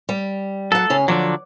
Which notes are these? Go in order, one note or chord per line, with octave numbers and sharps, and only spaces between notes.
G3
F#3 A4 F#5
C#3 C#4 G#4
D3 F3 F#3 D5